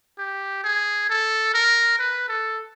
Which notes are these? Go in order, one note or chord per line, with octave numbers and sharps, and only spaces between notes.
G4
G#4
A4
A#4
B4
A4